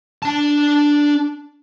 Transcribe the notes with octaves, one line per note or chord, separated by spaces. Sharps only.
D4 A5